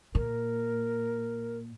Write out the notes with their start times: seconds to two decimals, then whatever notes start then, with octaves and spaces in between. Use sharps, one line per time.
0.15 A#2 A#4